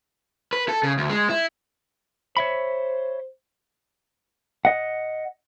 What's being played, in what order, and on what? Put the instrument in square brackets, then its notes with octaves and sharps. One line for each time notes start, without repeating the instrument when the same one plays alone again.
[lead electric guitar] B4
A4
C#3
D2
G#3
E4
[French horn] C5 [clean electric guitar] C#5 E5 B5
[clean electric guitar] D#5 F#5